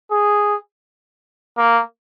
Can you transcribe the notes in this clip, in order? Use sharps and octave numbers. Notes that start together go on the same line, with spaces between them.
G#4
A#3